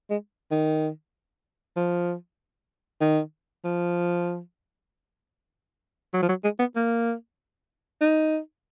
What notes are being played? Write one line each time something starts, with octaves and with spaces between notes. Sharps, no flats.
G#3
D#3
F3
D#3
F3
F#3
F3
F#3
G#3
B3
A#3
D#4